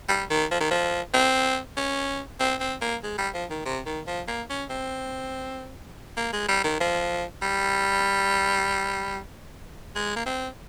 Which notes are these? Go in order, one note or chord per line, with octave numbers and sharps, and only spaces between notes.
G3
D#3
F3
D#3
F3
C4
C#4
C4
C4
A#3
G#3
G3
F3
D#3
C3
D#3
F3
A#3
C#4
C4
A#3
G#3
G3
D#3
F3
G3
G#3
A#3
C4